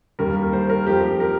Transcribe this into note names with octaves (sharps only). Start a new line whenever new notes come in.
D#2 D#3 G3 A#4
C5
A#4
F2 F3 G4
A#4